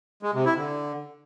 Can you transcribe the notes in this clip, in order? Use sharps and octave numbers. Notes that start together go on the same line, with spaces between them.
G#3
C3
E4
D3